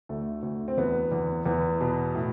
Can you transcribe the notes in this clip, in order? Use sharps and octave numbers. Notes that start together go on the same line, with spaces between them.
D2 A3
D2
C4
E2 B3
E2
E2 B3
B2
A2